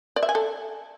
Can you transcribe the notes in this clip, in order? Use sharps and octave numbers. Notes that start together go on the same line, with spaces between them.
D5
E5
G#5
A4